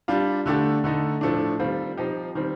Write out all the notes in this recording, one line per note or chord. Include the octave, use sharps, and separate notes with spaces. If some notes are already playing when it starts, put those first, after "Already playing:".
G3 D4 F4
D3 A3 D4 G4
D3 A3 D#4
A2 F3 A3 D4
D#3 G3 C4 F4
F3 C4 D#4 G4
D#3 G3 C4